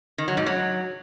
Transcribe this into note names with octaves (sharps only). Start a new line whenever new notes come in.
D#3
F#3
G#2
F#3